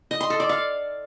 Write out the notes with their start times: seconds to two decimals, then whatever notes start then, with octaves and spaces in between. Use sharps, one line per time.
0.11 D#5
0.21 C6
0.30 A4
0.40 D5
0.49 F5